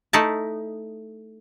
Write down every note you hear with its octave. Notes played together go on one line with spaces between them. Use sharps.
A3 D#4 E4 A5